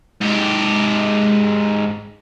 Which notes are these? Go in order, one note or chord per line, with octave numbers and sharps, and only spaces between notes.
G#2 G4